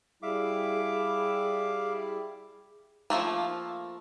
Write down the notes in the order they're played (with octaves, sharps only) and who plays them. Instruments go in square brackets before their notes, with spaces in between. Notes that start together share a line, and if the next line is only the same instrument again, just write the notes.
[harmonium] G3 E4 [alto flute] G#4 [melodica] E5 F5 D6
[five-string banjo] F3 G3 A3 A#3